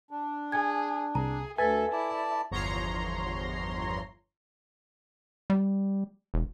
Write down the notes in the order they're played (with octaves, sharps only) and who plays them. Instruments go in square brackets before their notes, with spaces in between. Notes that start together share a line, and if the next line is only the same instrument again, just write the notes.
[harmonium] D4
[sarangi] G#4 [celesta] G#5 G#6
[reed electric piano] C2 [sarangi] G#4 [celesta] A#5
[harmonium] D2 E5 [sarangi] A4 [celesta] B4 A6 [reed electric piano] G#5
[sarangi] E4 [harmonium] D5 A5
[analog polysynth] G1 E2 F3 C#5 A#5 C6
[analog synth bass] G3
E1